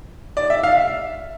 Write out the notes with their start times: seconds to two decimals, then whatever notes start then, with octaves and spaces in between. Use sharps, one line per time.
0.37 D5
0.50 E5
0.63 F5
0.77 E5